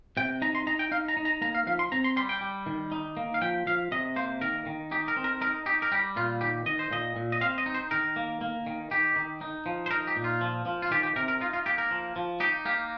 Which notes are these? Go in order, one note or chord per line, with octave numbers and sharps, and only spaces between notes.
C3 G5
D#4 A#5
C6
D#4 A#5
G5
D#4 F5
A#5
D#4
A#5
A#3 A#5
F5
F3 F5
C6
C4 A#5
C6
G3 C6
G5
G3
D#3
D#4
A#3
F5
F3 G5
F3 F5
C3 D#5
A#3 C5
D#3 A#4
D#3
D#4 G4
A#4
C4
A#4
D#4 A#4
D#4 G4
A#4
G3 G4
A#2 F4
D#3 G4
D#3 D#5
C5
A#2 D#5
A#2
D#5
C4 F5
D#5
D#4
C5
D#3 A#4
A#3
A#3
D#3
D#3 G4
D#3
D#4
F3
C5
D#4 A#4
G4
A#2
F4
F3
F3
F4
D#3 G4
G4
C3 A#4
A#4
D#4 F4
F4
A#3 G4
A#4
F3
F3
D#4 G4
A#3 G4